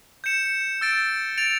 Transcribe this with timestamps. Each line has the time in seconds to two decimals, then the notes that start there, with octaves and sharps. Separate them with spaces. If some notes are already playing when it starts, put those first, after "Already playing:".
0.24 G6 C#7 E7
0.81 E6 A6 D7
1.38 A6 D7 F7